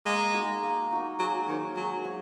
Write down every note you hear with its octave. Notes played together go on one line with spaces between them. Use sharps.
G#3 A#3
D#4 F#4 A#4
A#3
D#4 F#4 A#4
F#3 G#3
D#3 F#4 C#5
F#3 G#3
F#4 C#5